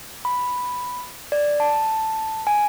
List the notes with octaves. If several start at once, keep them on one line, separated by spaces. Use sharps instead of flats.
B5
D5
A5
G#5